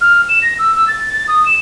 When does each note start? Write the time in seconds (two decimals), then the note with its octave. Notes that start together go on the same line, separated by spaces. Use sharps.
0.01 F6
0.29 E7
0.42 A#6
0.59 E6
0.75 E6
0.88 A6
1.12 A6
1.28 D#6
1.46 E7